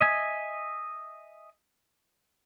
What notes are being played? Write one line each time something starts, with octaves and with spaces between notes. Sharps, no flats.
D#5 E5 G#5